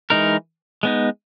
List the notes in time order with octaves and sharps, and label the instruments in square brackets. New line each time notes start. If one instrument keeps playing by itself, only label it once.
[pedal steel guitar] E3 G#3 D#4 A#4
G#3 B3 D#4